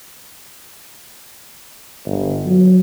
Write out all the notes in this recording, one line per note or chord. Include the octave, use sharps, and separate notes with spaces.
G1
F#3